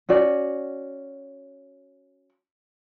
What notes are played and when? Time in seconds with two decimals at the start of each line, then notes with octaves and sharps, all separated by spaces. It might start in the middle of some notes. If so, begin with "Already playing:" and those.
0.09 C#4 F#4 D5